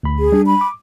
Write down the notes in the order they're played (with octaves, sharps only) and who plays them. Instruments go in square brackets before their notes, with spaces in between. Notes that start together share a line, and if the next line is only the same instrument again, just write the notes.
[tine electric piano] D2 B5
[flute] G#4
[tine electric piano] G3 D4
[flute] B5
[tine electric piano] D6